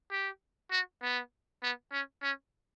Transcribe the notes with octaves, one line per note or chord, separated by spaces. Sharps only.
G4
F#4
B3
B3
C#4
C#4